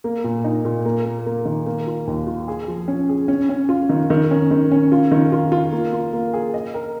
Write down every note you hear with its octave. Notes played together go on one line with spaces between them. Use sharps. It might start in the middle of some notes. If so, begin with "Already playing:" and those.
A#3
A#2
D#4
A#2
A#3
A#3
A#3
D#3
A#3
F4
D#2
F4
G#4
F3
C#4
G#4
C#4
C#4
F4
D#3
D#3
C#4
D#3
C#4
F4
D#3
F4
F4
A#3
F4
A#3
G#4
D#5
A#4